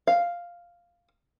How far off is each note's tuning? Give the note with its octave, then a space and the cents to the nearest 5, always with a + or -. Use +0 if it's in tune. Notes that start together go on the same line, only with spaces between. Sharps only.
F5 +0